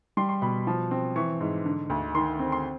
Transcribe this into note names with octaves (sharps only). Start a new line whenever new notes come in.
G3 C6
C6
B2 B5
F3
C4
E3 C#6
G#2
D3
D2
D#3 C6
C4
C6